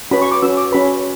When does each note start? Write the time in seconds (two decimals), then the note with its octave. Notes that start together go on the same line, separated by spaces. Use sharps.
0.11 C#4 F#4 B4 B5
0.22 C#6
0.31 D6
0.42 C#4 F#4 B4 E6
0.57 D6
0.72 C#4 F#4 B4 B5